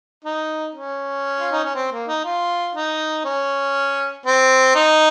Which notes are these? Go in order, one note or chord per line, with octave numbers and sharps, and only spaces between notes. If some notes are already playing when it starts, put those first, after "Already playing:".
D#4
C#4
F4
D#4
C#4
C4
A#3
D#4
F4
D#4
C#4
C4
D#4